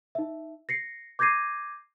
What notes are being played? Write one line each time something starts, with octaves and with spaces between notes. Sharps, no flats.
D#4 E5
A#6 C7 C#7
D6 G6 G#6 A#6 C7 D#7